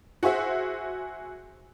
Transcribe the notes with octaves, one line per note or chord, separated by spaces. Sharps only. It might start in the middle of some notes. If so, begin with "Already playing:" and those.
F#4 G#4 C5 E5